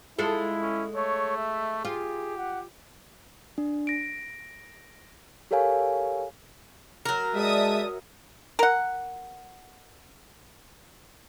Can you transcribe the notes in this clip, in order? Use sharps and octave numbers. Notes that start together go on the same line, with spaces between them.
G#3 E4 F4 A4
C#4
A3 C#5
E5
F4 G4 G#4
F#5
D4
A#6 D7
G4 A4 A#4 C#5 F5 G#5
F#3 A#4
G#3 D5 E5 A5 D#6
A#4 F#5